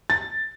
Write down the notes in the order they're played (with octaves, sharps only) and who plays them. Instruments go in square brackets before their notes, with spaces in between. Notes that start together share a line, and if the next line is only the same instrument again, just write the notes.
[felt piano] A6